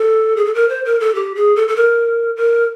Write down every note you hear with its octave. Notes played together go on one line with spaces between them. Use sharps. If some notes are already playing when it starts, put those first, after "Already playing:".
Already playing: A4
G#4
A4
A#4
C5
A#4
A4
G4
G#4
A4
A4
A#4
A#4